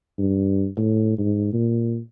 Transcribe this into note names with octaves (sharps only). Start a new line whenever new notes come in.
G2
A2
G#2
A#2